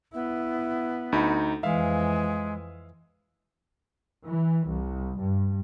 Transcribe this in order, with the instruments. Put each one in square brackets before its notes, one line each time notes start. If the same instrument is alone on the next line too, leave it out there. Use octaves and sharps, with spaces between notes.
[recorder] B3 [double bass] E4
[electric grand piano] D2 D#4 B5
[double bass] F2 E3 [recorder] G#3 [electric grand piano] E5 F5
[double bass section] E3
C2
G2